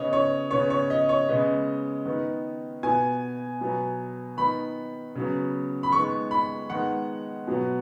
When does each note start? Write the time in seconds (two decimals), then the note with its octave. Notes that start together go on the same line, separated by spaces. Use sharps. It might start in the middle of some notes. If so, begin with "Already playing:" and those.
Already playing: C#3 B3 C#5 D#5
0.13 C#5
0.51 C#3 B3 C#5
0.70 C#5
0.90 D#5
1.09 C#5
1.29 C#3 G#3 B3 D#5
2.06 D#3 B3
2.83 B2 B3 G#5
3.61 B2 F#3 B3
4.37 D#3 B3 B5
5.15 C#3 F#3 B3
5.83 B5
5.92 D#3 G#3 B3 C#6
6.31 B5
6.70 D#3 G#3 B3 F#5
7.47 B2 F#3 B3